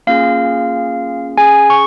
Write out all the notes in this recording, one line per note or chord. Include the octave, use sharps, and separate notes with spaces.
A#3 C#4 F4 G#4 F5
C#4 G#4 G#5
C#6